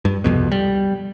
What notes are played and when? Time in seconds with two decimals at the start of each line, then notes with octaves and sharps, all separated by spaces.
0.05 G2
0.24 C2 F2 B2
0.52 G3